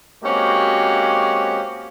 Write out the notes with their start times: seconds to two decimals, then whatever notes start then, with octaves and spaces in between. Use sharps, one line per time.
0.24 G#3 A#3 C4 C#4 F#4 G4